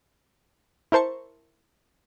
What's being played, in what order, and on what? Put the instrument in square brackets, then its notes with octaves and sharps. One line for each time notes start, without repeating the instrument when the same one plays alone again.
[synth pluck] E4 A#4 C5 A5 C#6